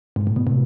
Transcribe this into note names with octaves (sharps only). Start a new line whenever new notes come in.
G#2
A2
B2
A2 C3